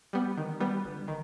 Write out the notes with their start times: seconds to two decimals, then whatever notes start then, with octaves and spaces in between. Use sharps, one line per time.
0.13 G3 B3
0.37 D#3
0.60 G3 B3
0.85 G1
1.08 D#3